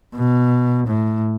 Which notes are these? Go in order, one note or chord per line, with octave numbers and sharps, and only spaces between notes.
B2
A2